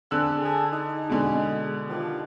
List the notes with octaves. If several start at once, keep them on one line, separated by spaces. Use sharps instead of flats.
D3 C4 G#4 A5 E6 F#6
G#4 A5
D#4
B2 D3 G#3
D#3 F3 G4